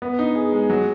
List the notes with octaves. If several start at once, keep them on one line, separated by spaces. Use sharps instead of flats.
B3
D#4
G#4
G#3
F#3